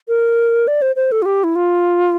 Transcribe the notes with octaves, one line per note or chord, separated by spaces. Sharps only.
A#4
D5
C5
C5
A4
F4
G4
E4
F4